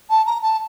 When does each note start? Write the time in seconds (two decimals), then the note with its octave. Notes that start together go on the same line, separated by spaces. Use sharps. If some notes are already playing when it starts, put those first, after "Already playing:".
0.10 A5
0.26 A#5
0.42 A5